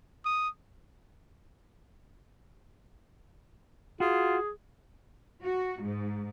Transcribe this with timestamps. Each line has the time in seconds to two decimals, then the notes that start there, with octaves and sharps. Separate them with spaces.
0.25 D#6
4.00 F4 F#4 G#4
5.43 F#4
5.81 G#2